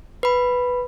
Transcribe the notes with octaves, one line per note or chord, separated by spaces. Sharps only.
B4 B5